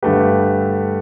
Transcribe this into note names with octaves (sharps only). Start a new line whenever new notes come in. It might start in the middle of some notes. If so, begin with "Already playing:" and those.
G2 D3 A3 G4 B4